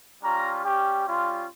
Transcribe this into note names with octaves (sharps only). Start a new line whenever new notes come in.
G3 C#4 F4 A#5
G3 C#4 G4
G3 C#4 F4